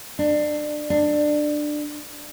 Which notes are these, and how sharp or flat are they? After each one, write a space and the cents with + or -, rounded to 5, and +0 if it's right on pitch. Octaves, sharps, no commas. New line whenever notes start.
D4 +25
D4 +20